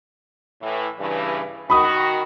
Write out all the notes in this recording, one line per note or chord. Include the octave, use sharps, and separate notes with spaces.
A2 E3
G2 C#3 E3
D#3 F#4 B5 D#6